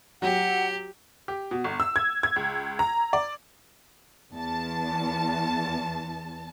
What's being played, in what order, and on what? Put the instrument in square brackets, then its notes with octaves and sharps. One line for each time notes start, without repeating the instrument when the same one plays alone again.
[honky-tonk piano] F#3 F#4 [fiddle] G4 [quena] F#5
[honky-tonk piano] G4
B2
G1
E6
G#6
G#6
C#2
A#5
D5
[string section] E2 A5